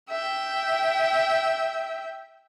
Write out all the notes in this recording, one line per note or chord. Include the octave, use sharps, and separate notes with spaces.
E5 G5